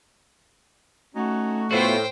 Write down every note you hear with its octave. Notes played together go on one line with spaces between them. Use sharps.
A3 C#4 D#4 F#4
A2 B3 F4 F#4 C5 G5